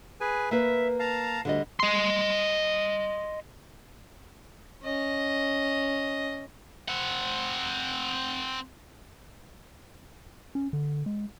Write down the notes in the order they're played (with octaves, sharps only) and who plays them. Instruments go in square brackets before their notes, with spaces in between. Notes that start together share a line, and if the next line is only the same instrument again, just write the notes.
[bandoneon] G#4 B4 G#5
[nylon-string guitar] A#3 B4 [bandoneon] E5
[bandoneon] F5 A5 A#5
[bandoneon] D2 [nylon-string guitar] D3 G3 D#5
[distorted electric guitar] D#5 C6
[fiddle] C#4 D#5
[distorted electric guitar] C4 F#5
[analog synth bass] C#4
D3
G#3